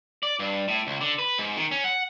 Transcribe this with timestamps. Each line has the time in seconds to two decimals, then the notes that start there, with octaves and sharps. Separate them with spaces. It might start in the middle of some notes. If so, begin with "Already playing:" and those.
0.23 D5
0.39 G2
0.68 A2
0.87 C#2
1.01 D3
1.19 B4
1.38 G#2
1.57 D#3
1.71 C#4
1.84 F#5